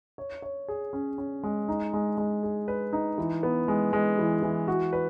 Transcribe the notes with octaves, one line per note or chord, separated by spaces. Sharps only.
C#5
C#5
G#4
C#4
C#4
G#3
D#4
G#3
G#3
G#4
B4
D#4
E3
B3
G#3
G#3
E3
E3
F#4
B4